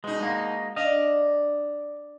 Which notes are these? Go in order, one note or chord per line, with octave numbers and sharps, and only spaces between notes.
B2 G#3 D#4
G#3 A#3 F#4
D4 D#5 F5